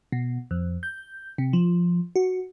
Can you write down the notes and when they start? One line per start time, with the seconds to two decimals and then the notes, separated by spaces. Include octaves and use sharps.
0.12 B2
0.51 F2
0.83 G6
1.38 C3
1.53 F3
2.16 F#4